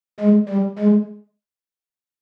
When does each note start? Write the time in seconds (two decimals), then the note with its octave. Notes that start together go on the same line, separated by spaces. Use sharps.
0.20 G#3
0.49 G3
0.79 G#3